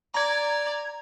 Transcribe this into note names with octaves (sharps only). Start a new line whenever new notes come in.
D5 A#5 G#6